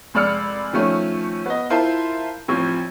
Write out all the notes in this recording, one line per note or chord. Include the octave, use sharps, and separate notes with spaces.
F1 G#3 D5 E6 F6 C#7
D#3 F3 A3 C#4
B3 D#5
E4 F4 A#4 C5 A5 C6
A1 F3 C4 C#6